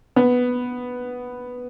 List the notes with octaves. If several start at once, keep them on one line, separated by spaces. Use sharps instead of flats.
B3